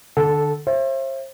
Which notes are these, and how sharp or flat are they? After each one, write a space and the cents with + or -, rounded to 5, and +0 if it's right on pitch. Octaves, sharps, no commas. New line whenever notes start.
D3 +25 A4 -10
C5 +40 E5 +25